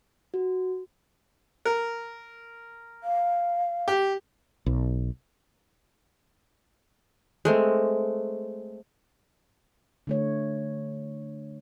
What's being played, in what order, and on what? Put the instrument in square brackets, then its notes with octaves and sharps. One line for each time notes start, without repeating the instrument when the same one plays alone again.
[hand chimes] F#4
[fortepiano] A#4
[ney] F5
[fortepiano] G4
[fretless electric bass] B1
[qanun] G#3 A3 C4
[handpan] D3 A3 C#5